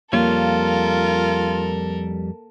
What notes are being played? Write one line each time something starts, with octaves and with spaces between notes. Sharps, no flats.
F2 G3 A#3 F4 A4 A#4 C#5